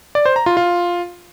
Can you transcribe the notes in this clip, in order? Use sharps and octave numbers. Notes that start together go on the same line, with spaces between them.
D5
C5
A#5
F4
F4